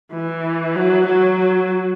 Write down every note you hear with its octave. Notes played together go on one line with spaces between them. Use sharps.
E3
F#3
F#3